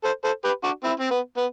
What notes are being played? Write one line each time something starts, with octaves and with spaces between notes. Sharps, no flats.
A4 C5
A4 C5
G4 B4
D4 F#4
C4 E4
C4
B3
B3